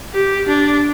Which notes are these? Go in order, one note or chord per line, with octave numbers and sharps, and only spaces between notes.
G4
D4